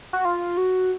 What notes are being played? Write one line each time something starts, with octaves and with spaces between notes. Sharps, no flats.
F#4
F4
F#4